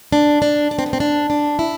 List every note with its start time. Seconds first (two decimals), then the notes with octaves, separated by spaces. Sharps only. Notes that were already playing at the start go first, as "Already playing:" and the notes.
0.12 D4
0.42 D4
0.71 D4
0.79 C4
0.86 B3
0.93 C4
1.00 D4
1.30 D4
1.59 E4